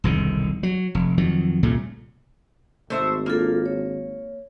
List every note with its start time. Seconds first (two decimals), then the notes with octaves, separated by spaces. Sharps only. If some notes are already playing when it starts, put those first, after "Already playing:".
0.04 E1 C2 D3 D#3
0.63 F#3
0.95 F1
1.18 F2 D#3 F#3
1.63 C2 A#2 C#3 A3
2.90 G#1 A3 C5 E5
3.26 A#3 D4 F4 A4
3.66 C#5